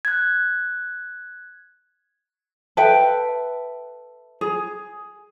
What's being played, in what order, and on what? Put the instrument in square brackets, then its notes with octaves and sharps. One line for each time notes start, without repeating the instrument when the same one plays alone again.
[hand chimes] F#6 G#6
[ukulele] A4 B4 E5 G5
G#4